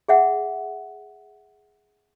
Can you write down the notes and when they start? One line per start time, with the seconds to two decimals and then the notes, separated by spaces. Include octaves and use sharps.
0.08 G#4 E5 F#5